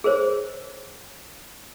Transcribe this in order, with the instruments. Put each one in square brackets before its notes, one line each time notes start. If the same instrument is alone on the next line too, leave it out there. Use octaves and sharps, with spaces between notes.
[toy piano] G#4 A#4 C5 C#5